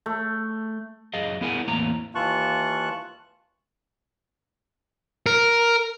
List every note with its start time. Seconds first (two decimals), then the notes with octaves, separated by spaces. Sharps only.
0.06 A3
1.14 F#2 G#4 D#5 F5
1.41 B3 E4 G#4 A#4 F#5 G#5
1.68 E2 A2 A#3 C4 A#5
2.15 D#2 E3 F4 A5 C#6 F#6
5.26 A#4